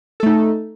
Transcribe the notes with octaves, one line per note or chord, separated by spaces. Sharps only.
A3 D#4 A4